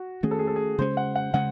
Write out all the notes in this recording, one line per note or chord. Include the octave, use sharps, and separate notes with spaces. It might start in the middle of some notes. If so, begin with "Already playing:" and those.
Already playing: F#4
D#3 A3 C#4 G#4
A4
G#4
A4
G#4
C#3 G#3 C#4 C5
F#5
F#5
C#3 G#3 C#4 F#5